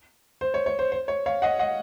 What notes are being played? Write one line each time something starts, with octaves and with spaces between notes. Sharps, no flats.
C5
C#5
C#5
C5
C5
C#5
C#5 F5
D#5 F#5
D#5 F#5